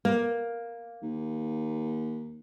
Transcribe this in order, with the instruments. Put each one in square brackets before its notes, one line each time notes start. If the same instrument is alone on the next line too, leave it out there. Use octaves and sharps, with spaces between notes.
[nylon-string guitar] A#3
[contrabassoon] D#2